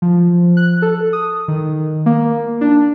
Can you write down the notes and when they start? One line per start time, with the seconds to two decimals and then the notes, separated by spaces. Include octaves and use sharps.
0.02 F3
0.57 F#6
0.82 A4
1.13 D#6
1.48 D#3
2.06 A#3
2.61 D4